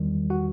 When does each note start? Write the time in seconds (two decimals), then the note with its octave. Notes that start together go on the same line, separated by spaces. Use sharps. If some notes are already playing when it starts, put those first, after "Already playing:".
Already playing: E2 D#3 G3
0.30 F#4 F#5